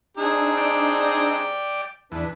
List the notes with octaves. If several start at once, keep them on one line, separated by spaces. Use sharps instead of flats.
C4 D4 D#4 G#4 E6
D5 G5
E2 D4 B4